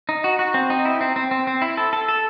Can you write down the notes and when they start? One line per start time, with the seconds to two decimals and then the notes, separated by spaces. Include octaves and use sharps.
0.09 D#4
0.24 F#4
0.39 F#4
0.54 C4
0.70 D#4
0.85 E4
1.01 C4
1.16 C4
1.31 C4
1.47 C4
1.62 E4
1.77 A4
1.93 A4
2.08 A4